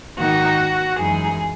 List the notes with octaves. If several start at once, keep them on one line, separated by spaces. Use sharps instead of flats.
G#2 D#3 A#3 D#4 F#4
F#2 E3 G#3 D#4 G#4